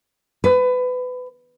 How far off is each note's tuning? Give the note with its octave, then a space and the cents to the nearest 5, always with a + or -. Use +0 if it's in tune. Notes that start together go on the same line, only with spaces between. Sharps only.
B4 +25